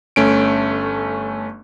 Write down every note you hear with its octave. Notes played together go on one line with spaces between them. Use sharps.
G1 A3 C#4 D7